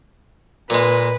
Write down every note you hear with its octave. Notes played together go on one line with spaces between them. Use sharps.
A#2 G#3 B4